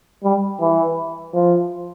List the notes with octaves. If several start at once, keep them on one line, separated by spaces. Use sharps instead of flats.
G3
E3
F3